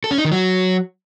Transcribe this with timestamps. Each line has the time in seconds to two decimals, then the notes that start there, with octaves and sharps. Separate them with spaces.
0.04 A4
0.11 C#4
0.18 D#4
0.25 D#3
0.32 F#3